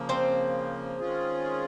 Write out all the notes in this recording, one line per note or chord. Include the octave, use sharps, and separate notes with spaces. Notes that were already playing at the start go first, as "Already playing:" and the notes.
Already playing: C#3 F3 A#3
C4 C5
D#3 G#3 C#4 F4 G#4